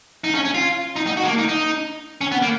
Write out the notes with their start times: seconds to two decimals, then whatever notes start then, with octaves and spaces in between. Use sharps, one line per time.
0.24 D#4
0.35 C#4
0.45 C#4
0.54 F4
0.96 D#4
1.07 D#4
1.17 F#4
1.24 G#3
1.28 A#3
1.38 D#4
1.49 D#4
2.21 C#4
2.32 B3
2.42 A#3